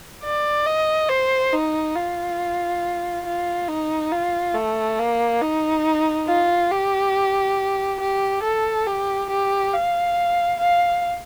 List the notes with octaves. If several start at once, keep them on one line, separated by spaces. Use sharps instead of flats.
D5
D#5
C5
D#4
F4
F4
D#4
F4
A3
A#3
D#4
F4
G4
G4
A4
G4
G4
F5
F5